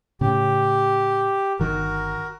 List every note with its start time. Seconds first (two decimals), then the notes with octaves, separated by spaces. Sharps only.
0.21 A2 C#3 G4
1.59 G1 D#3 F#4 A#4